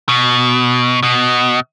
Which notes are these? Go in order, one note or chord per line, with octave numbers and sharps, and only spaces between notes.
B2
B2